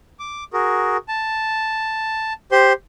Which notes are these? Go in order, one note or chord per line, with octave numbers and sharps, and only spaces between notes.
D6
F#4 G#4 A#4
A5
G4 C5 C6